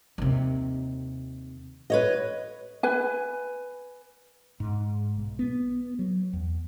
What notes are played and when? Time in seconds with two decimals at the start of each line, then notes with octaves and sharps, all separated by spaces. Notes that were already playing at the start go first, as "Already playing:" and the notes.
0.18 D#2 C3
1.90 B4 C#5 D#5
2.83 B4 G#5
4.60 G#2
5.17 B1
5.39 B3
5.99 F#3
6.33 E2